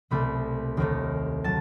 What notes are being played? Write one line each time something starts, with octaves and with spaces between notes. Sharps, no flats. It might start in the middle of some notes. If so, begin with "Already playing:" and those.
C2 B2 A3 B5
D#2 D#3 A3
F#3 A5